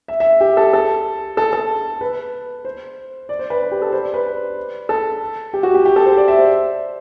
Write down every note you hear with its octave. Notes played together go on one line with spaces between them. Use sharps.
E5
E5
G4
A4
A4
A4
A4
B4
C5
D5
C5
B4
G4
A4
C5
D5
B4
A4
G4
F#4
G4
G4
A4
C5
D5
E5
C5